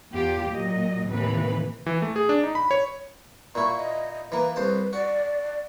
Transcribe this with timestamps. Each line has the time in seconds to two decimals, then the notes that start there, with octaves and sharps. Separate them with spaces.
0.13 E2 F4 G4
0.50 A#2 F#3 D#5
1.08 D#2 A2 C3 E3 B4
1.86 E3
2.02 A3
2.16 G#4
2.29 D4
2.43 D#4
2.55 B5
2.71 C#5
3.55 A#2 E4 C#6
3.77 D#5
4.32 E3 A#3 B4
4.56 C2 C5 A5
4.93 F#4 D5